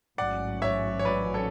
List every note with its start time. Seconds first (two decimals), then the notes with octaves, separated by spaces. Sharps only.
0.18 A1 G#2 F#3 C#4 D5 F#5
0.62 C#5 E5
0.99 C#5
1.05 B4 D5
1.34 A4 C#5